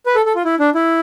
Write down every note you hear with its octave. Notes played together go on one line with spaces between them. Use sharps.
B4
A4
A4
F4
E4
D4
E4